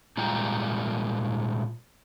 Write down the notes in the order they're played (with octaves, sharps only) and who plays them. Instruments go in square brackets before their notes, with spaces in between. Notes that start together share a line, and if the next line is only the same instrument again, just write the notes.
[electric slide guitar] A#2 G3 G#3 F4 G5 A#5